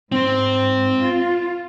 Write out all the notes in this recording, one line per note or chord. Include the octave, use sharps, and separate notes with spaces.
G#2 C4 C5
F4